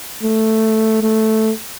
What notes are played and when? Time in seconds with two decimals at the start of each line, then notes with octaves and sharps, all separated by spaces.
0.23 A3
1.02 A3